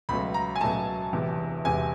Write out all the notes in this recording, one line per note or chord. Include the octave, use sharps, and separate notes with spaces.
C#2 B2 F#3 A3 B5
A#5
G#5
C#2 B2 F#3 A3 A5
E1 E2 C3
E1 E2 C3 G#5